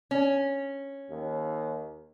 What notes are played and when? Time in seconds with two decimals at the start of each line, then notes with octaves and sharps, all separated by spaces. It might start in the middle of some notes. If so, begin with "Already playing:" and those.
0.11 C#4
1.10 D#2